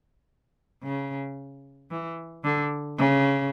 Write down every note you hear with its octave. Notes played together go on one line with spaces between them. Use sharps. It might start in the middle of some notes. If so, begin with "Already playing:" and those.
C#3
E3
D3
C#3